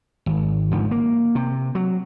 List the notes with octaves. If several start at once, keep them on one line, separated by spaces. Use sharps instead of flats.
G#1
G#1 G#2 D3 F3
A#3
C3
F#3